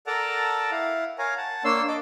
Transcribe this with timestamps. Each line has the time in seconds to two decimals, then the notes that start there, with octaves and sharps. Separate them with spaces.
0.07 A4 A#4 D5 F#5 A5 A#5
0.71 E4 F5 F#5
1.18 A#4 C#5 F5 G#5 A#5
1.37 F#5 A5
1.64 A#3 D4 C#5 C6 E6
1.88 D5 D#5 A5 D6